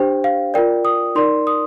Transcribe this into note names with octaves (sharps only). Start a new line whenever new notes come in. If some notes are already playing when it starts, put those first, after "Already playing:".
Already playing: D4 G4 C5 G5
F5
F4 A#4 D5 G5
D#6
D#4 A#4 D5 C6
D#6